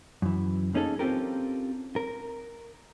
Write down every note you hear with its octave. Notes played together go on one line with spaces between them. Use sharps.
F#2 E3
A#3 C#4 D#4 G#4 A4
C4 C#4 F4 G4 A4 A#4
A#4